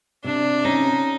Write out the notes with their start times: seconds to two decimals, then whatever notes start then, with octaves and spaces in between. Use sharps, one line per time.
0.24 C3 D4
0.65 C#4 D#4